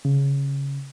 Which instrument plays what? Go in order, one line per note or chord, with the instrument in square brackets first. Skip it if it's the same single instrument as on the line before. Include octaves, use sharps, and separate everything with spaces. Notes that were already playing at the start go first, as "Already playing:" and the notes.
[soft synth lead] C#3